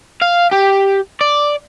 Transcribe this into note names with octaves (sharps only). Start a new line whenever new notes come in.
F5
G4
D5